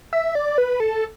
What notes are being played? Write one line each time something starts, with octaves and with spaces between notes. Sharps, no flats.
E5
D5
B4
A4